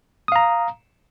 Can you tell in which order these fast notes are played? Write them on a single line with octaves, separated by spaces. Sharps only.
D#6 F5 A#5